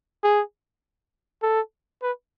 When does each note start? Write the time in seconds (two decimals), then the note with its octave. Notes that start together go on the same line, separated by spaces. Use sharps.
0.24 G#4
1.42 A4
2.02 B4